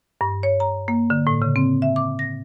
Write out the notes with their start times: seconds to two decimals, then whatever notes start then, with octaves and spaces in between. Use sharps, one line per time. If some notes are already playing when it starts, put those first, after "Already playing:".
0.21 G2
0.43 C#5
0.60 A#5
0.88 A#3
1.10 D3
1.27 A2
1.42 C#3
1.56 C4
1.82 E5
1.96 D6
2.19 A#6